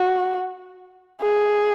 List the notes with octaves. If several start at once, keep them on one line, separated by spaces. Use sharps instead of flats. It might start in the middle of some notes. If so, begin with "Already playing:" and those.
Already playing: F#4
G#4